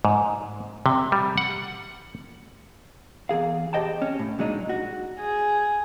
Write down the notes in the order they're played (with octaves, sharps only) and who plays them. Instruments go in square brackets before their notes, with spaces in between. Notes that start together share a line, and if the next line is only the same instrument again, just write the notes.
[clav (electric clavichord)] G#2
C3
G3
F#5
[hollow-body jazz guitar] E2 C#3 G#4 F5
G4 C5 D#5 G5 A5
C#4
A2
A#2 F#3 G#3 D4 D#4
F#4
[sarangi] G#4